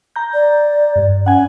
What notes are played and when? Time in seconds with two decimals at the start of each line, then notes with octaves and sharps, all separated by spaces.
0.16 A#5 G6
0.34 D5
0.96 G2
1.26 C#4 F#5 G#5